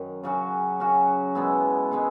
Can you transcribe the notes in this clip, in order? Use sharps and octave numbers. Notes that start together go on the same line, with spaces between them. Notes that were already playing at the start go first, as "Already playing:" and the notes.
Already playing: F#2 D#3
C#3 F#3 C#4 F#4
C#3 F#3 C#4 F#4
B2 G#3 B3 E4
B2 G#3 B3 E4